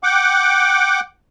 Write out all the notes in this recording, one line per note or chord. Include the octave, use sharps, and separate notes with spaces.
F#5 G5 D6